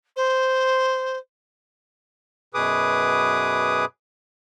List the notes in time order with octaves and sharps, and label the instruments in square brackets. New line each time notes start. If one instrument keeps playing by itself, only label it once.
[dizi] C5
[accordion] F#2 B2 G#4 B4 D6 D#6